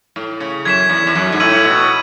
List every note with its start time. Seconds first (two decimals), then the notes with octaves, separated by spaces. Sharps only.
0.16 A2
0.40 C#3
0.65 F#2 G#6 B6 E7
0.89 E2
1.07 E2
1.15 F#2
1.32 G#2
1.40 A2 E6 G#6 D#7 F#7
1.64 B2